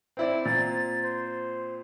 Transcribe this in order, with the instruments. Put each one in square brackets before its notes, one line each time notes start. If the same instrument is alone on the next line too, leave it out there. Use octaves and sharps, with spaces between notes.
[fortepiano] C4 E4 D5
[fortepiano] A#2 C4 [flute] A6
[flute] C5